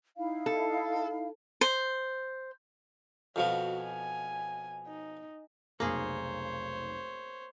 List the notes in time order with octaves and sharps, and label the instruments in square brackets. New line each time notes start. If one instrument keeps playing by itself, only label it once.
[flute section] D#4 E4 F5
[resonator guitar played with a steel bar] A4
[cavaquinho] C5
[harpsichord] F2 B2 F3 [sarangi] F#4
[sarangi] G#5
D#4
[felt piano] F1 B1 [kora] A#3 G#4 [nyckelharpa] C5 C#5